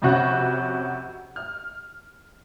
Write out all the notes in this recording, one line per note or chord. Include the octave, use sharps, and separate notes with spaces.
F2 C3 C#4 F#4 F#5
F6